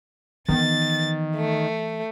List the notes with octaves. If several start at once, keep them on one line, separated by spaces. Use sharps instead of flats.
D#3 E3 B3 A6
A3